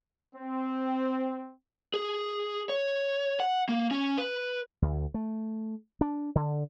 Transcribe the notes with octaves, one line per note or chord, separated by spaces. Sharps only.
C4
G#4
C#5
F#5
A#3
C#4
B4
D2
A3
D4
D3